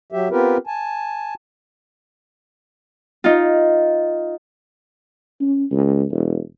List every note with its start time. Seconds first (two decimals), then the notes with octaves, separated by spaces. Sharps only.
0.12 F#3 G4 E5
0.31 B3 C4 F4 G4 A#4 B4
0.67 G#5 A5
3.24 D#4 F4
5.41 C#4
5.71 C#2
6.11 E1